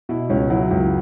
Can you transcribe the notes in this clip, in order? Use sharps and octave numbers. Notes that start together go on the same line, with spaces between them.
B2 E4
C#2 C#4
F#3 E4
C#2